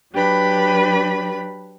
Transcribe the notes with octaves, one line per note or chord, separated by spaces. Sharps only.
F#3 D4 G4 B4 B5